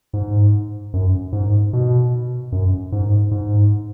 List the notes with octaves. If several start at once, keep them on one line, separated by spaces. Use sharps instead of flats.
G#2
F#2
G#2
B2
F#2
G#2
G#2